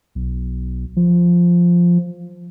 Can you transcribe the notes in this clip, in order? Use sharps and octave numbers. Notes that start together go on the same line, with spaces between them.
B1
F3